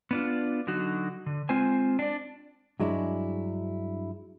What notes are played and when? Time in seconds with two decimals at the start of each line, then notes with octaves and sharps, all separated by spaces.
0.11 B3 D4 F4
0.67 D3 F#3 D#4 F#4
1.26 D3
1.49 G#3 C4 F4 C5 G#5
1.99 D4 D5
2.80 G2 F#3 G#3 D4 E4